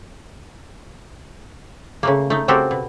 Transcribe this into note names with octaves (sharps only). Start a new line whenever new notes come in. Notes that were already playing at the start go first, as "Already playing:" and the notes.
C#3 A3 A#3
A3 D#4
C#3 C4 F#4 G4 A4 A#4
B2